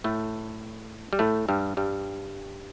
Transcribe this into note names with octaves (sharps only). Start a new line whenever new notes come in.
A2 A3
G3
A2 A3
G2 G3
G2 G3